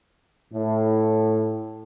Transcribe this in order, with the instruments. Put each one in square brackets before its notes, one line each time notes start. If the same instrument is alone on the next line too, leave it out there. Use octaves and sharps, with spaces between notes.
[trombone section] A2